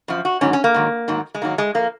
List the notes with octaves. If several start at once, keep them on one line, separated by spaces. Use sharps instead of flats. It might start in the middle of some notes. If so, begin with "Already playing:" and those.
F#2 F3
F#4
G#2 D#3 F#3 C#4
C#4
A#3
G#2 D#3 F#3
G#2 D#3 F#3
G#3
G#2 D#3 F#3 A#3
G#3
F3 A#3